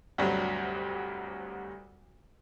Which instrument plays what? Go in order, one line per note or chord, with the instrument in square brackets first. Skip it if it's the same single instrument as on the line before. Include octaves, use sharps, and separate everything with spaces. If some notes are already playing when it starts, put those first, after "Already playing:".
[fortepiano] D2 G2 C3 F#3